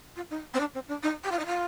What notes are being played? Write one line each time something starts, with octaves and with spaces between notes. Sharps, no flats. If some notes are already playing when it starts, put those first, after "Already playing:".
F4
D#4
C4
D4
C4
D4
D#4
G4
F4
D#4
F4